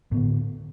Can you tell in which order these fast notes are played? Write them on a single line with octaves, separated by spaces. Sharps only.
A2 B3 D3